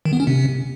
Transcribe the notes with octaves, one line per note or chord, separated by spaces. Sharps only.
D#3
B3
C#4
C3